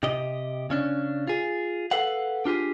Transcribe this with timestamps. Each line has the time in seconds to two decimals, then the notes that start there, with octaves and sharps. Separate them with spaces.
0.03 C3 G4 D#5
0.70 C#3 C#4 D4
1.27 F4 G#4
1.91 A4 B4 F5 F#5
2.45 D4 F4 G4 G#4